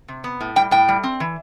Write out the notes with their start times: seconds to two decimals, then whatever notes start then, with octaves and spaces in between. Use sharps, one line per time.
0.08 C3
0.24 B3
0.41 A2
0.56 G3 G5
0.71 A2 G5
0.88 G3
1.04 C4
1.20 E3